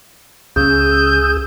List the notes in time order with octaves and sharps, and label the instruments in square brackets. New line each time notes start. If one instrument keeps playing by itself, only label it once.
[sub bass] C#2 [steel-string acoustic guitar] C#3 [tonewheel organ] G#4 D#6 E6 [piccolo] G6